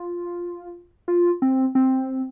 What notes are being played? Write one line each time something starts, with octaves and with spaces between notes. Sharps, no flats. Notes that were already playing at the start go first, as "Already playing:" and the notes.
Already playing: F4
F4
C4
C4